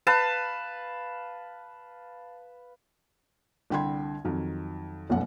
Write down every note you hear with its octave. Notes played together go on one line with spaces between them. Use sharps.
B4 F5 A5
C2 D3 G5 B5 C6 G#6
F2 D#3 F#3
F1 B1 F#2 B2 F#5